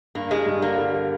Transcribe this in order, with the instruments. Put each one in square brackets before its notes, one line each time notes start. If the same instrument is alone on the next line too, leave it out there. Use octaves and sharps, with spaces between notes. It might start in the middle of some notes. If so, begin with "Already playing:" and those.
[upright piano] G2 [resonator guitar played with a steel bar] A#3
[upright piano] G3 [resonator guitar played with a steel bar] G#3
[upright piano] G2
[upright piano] D3 [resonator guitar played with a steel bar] A#3
[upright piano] G3
G3